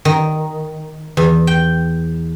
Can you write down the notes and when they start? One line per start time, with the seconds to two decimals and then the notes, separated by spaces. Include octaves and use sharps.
0.05 D#3
1.17 E2
1.47 G5